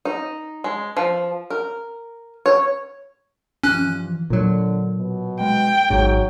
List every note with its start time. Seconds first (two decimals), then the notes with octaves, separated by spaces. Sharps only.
0.05 D#4
0.64 G#3
0.97 F3
1.50 A#4
2.46 C#5
3.64 G2 E3 F3 C#4 F#6
4.30 A#2 D3 F#3
4.97 B2
5.40 G#3 G5
5.90 A1 G#2 F#3